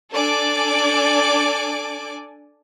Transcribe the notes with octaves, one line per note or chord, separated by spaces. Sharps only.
D4 A4 D5 G#5 D6